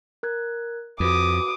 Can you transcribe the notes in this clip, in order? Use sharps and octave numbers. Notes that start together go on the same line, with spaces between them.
A#4 F#6 G#6
F2 F#4 B4 B5 D6 D#6